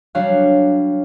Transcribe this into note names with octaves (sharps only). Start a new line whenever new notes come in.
F#3 G3 D4 F#4 C#5 F5